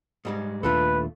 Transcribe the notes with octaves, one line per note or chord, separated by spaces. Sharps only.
G#2 G3 G#3
D#1 D#2 A3 D4 F4 A4 B4